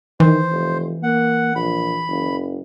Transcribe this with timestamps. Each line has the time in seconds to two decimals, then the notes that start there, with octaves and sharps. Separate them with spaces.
0.20 D#3 E3 C5
0.50 F1
1.03 A#3 F#5
1.56 A#1 B5
2.09 F#1